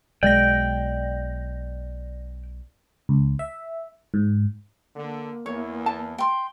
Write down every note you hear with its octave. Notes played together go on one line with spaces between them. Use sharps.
B1 G#3 D5 G5 A#6
C#2
E5
G#2
D3 A#3
E2 C#5
A5
G5 C6